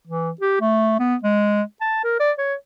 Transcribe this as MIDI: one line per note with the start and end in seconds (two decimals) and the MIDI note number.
0.07 0.30 52
0.41 0.58 67
0.61 0.98 57
0.99 1.15 59
1.23 1.62 56
1.81 2.03 81
2.04 2.17 70
2.20 2.32 74
2.38 2.55 73